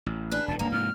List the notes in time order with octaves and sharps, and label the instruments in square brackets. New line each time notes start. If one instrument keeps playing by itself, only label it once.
[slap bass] A1
[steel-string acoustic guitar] C#3 D4 B4 [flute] F#6
[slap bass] E1 D2 A2 [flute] A5
[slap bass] D1 G2 C#3 [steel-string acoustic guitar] A#3 [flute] A#5
[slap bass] G#2 C3 F3 [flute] F6